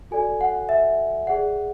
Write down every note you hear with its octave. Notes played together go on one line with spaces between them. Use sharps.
F#4 A4 D5 G#5
F#5
E5
G#4 D5 F#5